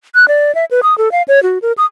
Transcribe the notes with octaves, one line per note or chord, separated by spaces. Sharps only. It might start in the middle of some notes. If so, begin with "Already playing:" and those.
F#6
D5
E5
B4
D#6
A4
F5
C#5
F#4
A#4
D#6